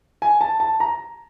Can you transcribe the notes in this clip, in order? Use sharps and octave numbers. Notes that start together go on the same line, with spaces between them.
G#5
A5
A5
A#5